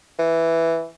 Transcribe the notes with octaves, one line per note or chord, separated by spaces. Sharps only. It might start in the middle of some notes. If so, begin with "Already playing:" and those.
E3